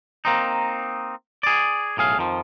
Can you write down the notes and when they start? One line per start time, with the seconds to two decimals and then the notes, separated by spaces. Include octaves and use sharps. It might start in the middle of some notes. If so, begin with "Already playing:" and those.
0.25 A#3 C4 D#4
1.43 G#4 D5
1.97 B1 A2 G#4 F5
2.18 F2 D#3 F3